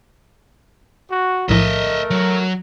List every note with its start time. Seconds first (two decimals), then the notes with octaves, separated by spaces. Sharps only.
1.10 F#4
1.49 B1 A2 F3 A3 A#4 D#5 E5
2.11 F#3